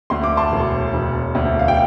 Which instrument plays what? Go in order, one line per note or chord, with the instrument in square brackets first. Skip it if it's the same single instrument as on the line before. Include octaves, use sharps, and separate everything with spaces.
[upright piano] D2 C6
D6
A5 C6
E1
E1
D2
F5
G5